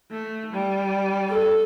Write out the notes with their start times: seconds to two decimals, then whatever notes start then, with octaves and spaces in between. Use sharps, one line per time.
0.12 A3
0.53 G3 D5
1.30 A4